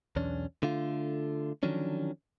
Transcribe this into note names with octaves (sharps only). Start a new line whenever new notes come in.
B1 E2 C#4 D4
D3 A3 F4
D3 D#3 F3 F#3 C#4 D4